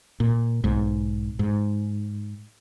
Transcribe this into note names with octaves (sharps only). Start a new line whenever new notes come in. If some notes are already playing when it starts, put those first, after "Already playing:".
A#2
B1 G#2
G#2